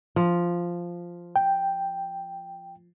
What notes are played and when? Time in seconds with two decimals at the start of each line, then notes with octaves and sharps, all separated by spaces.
0.16 F3
1.36 G5